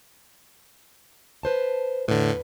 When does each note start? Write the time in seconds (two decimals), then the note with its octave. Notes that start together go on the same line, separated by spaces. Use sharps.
1.43 B4 C5 A5
2.08 E2 A2 D3 B4